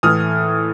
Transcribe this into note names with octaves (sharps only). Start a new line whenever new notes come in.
A2 E3 A3 D#6 F6